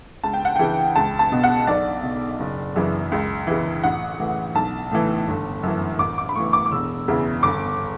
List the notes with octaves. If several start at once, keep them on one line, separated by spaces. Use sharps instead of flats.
C#2 A5
G5
F#5
C#3 E3 G5
C#2 A5
A5
B2
F#5
B1 D5
B2
F#1
F#2 C#3 E3
C#2
C#3 E3
A1 F#5
A2 E3
B1 A5
A2 E3
G1
F#2 E3
A1 D6
D6
B5
A2 E3 C#6
D6
D6
E1 E6
E2 C#3 E3
G1 D6